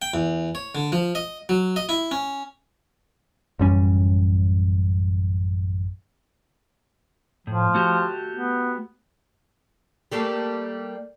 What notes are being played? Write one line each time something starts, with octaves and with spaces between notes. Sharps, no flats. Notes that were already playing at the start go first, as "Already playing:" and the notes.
G5
E2
C#5
D3
F3
D#5
F#3
D#5
E4
C#4
A1 F#2 G3 C#4
A2 F3
A3 F#4 G4
B3
G3 A3 A#3